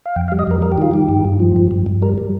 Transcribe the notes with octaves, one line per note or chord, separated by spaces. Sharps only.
F5
F2 G5
F5
G3
D#5
F2 A#4
G3 A#4
G4
D#3 F4
D#3 G4
G2
G2
F3
G2
G2
G2
G3 A#4
G3